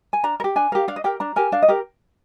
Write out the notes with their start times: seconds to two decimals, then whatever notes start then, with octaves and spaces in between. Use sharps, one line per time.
0.13 G#5
0.23 D4 A#5
0.40 A#4
0.44 G4
0.56 D4 G#5
0.72 G4 A#4 F5
0.88 D4 F5
0.96 D#5
1.04 G4 A#4 G5
1.20 D4 A#5
1.36 G4 A#4 G#5
1.52 D4 F5
1.62 D#5
1.68 G4 A#4